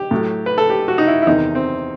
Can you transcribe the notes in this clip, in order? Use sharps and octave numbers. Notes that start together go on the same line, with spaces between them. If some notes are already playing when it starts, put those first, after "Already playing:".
Already playing: G4
A2 F#3 A3
B4
A4
G4
F#4
D#4
E4
E4
E2 C3 D#3 D#4
C4